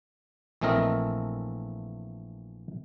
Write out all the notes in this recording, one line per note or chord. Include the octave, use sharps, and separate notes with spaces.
A#1 E3 A3 C4 A#4 D#5